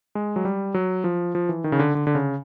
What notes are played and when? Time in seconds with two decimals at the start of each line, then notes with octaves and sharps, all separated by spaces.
0.15 G#3
0.36 F#3
0.45 G3
0.74 F#3
1.04 F3
1.35 F3
1.49 E3
1.64 D#3
1.72 C#3
1.79 D3
1.95 D3
2.07 D3
2.15 C#3